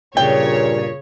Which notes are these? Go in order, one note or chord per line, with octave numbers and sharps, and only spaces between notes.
G2 A#2 C#3 C#5 G5